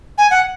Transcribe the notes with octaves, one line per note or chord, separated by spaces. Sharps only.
G#5
F#5